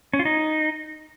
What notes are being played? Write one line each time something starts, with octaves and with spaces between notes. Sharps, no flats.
C#4
F4
D#4